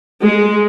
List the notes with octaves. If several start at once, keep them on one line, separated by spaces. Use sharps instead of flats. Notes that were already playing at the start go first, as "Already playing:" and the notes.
G#3